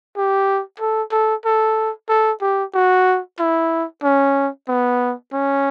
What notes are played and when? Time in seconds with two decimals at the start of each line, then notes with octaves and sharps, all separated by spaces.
0.16 G4
0.80 A4
1.12 A4
1.45 A4
2.09 A4
2.41 G4
2.74 F#4
3.39 E4
4.03 C#4
4.68 B3
5.33 C#4